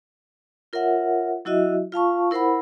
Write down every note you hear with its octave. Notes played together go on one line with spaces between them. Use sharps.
F4 A#4 C#5 E5 F#5
F#3 E4 F#4 D#5 E5
F4 F5 A5 C#6
E4 A#4 C5 F#5 B5